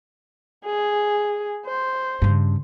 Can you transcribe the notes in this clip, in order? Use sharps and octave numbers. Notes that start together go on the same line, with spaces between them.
G#4
C5
G2 C#3